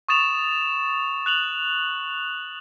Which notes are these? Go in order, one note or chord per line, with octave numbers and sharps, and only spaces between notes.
C#6 D#6 A6 E7 F7
F#6 F7 F#7